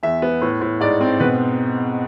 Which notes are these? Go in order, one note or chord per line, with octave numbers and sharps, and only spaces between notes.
E2 E5
B3
A2
A2
G#2 D5
C4
B2 B4